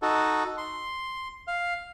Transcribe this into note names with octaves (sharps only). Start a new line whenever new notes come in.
D#4 F#4 A4
C6
F5